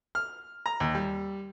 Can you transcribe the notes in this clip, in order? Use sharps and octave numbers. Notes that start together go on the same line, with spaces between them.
F6
A#5
D#2
G3